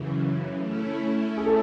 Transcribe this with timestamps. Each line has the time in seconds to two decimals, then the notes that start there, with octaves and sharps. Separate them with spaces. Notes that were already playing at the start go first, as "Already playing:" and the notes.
Already playing: F#2 C#3 E3
0.57 A3 C#4 E4
1.37 G#4
1.46 A4